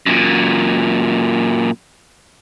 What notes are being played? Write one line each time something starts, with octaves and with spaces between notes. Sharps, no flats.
F#2 A#2